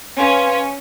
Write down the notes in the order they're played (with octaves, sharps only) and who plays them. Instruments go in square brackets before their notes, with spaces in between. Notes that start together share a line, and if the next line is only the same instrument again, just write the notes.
[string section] C#4 [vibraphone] B4 F5 C6